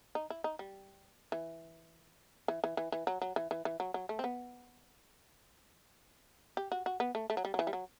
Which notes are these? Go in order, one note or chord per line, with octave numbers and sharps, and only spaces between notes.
D#4
E4
D#4
G3
E3
E3
E3
E3
E3
F#3
F#3
E3
E3
E3
F#3
F#3
A3
C4
B3
G4
F#4
F#4
B3
A3
A3
F#3
G3
F#3
E3
G3
F#3